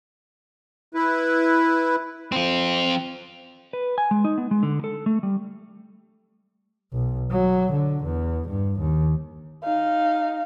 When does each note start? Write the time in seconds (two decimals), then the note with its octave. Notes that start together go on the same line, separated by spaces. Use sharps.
0.94 E4 B4
2.32 F3 C4
3.73 B4
3.98 G#5
4.11 G#3
4.24 D#4
4.38 B3
4.51 G#3
4.63 D3
4.84 A4
5.06 A3
5.23 G3
6.93 B1
7.31 F#3
7.72 D3
8.04 E2
8.48 G2
8.79 D#2
9.63 D#4 F5